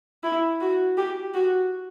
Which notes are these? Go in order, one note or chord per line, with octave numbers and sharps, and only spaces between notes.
E4
F#4
G4
F#4